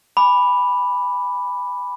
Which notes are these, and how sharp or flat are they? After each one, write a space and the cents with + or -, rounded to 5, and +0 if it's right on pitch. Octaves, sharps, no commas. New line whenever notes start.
G#5 -20 B5 +0 D6 +5